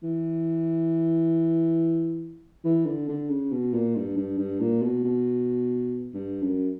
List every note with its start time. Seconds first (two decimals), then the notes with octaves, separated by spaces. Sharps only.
0.03 E3
2.65 E3
2.86 D3
3.08 D3
3.30 C#3
3.51 B2
3.74 A#2
3.96 G2
4.17 G2
4.38 G2
4.60 A#2
4.82 B2
5.04 B2
6.14 G2
6.42 F#2